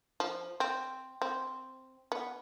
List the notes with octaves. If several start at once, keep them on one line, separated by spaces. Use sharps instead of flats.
F3
C4
C4
B3